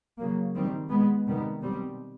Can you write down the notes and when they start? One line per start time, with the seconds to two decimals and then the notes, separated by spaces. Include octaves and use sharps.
0.18 C#3 F#3 A#3
0.54 D#3 G3 C4
0.90 B2 G#3 B3
1.26 C3 D#3 G3 B3
1.62 B2 G3 C4